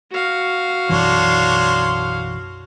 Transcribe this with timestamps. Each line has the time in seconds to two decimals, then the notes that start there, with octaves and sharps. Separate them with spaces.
0.12 F#4 F5
0.89 B1 F#2 E3 D4 C#5 C6